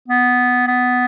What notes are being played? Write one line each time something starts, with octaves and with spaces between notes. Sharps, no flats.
B3
B3